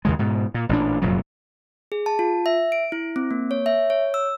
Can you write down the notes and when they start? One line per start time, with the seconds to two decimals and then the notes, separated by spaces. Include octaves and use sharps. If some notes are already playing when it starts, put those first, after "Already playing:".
0.05 D#2 C#3 G#3
0.19 G#2 B2
0.54 A#2
0.69 A1 A#2 D4
1.02 F1 F#2 A#2 F#3
1.92 G#4
2.06 A5
2.19 F4
2.46 E5
2.72 D7
2.92 E4
3.16 C4
3.31 A#3
3.51 C#5
3.66 E5
3.90 C#5
4.14 E6